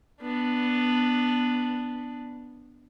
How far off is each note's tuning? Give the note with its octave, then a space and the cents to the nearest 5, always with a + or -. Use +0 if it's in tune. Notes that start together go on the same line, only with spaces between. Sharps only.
B3 +0 D4 +0